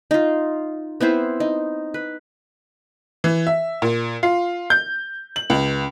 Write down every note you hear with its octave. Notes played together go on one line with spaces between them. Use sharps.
D#4 F4
B3 C4 E4 C5
D#4
B4
E3
E5
A#2
F4
G6
F#7
C#2